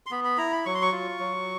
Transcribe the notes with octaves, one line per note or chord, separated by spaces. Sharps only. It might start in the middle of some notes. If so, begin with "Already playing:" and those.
C6
B3 B5
B5
E4 A#5
B5
F#3 C#6
C6
C#6
F4
F#3